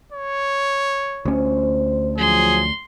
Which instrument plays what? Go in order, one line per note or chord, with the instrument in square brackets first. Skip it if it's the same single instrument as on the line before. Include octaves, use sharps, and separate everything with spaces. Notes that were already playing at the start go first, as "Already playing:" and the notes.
[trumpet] C#5
[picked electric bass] D2 C#4 [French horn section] C5
[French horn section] F3 F#3 [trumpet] G#4 [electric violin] C6